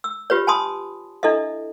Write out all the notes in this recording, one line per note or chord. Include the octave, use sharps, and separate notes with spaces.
E6
F4 G4 B4 C#5
G#5 A5 B5 C6 D#6
D4 E4 A4 D#5 E5